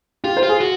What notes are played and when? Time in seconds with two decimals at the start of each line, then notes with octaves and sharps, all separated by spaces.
0.24 F4 G4
0.37 C5
0.43 F4
0.49 G#4
0.61 F#4